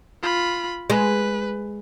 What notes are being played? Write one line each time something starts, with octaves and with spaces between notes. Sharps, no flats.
F4 B5
G#3 B4